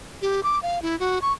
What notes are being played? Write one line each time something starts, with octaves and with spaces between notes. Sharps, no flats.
G4
D6
F5
E4
F#4
C#6